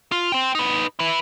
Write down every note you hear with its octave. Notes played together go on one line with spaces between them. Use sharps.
F4
C4 G5
D#4 B4
E4 B4